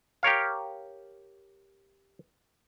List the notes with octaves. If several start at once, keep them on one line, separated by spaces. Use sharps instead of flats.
G4 A#4 C#5 F5